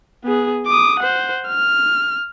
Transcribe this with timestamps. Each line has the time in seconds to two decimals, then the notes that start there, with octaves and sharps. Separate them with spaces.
0.24 B3 G#4
0.66 D6 D#6
1.00 C5 F#5
1.48 F6